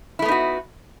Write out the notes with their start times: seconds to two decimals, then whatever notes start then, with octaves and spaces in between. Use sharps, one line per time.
0.19 E4
0.22 A3
0.25 B3
0.28 D#4
0.32 F#4